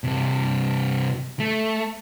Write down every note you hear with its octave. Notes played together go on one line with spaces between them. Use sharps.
G2 C3
A3